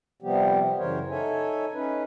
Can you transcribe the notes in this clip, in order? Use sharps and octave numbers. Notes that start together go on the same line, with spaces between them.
C3 F3 G3 B3 G4
F#2 C#3 E3 A#4 C5 C#5
D#4 A4 C#5 E5 G#5
C#4 D#4 B4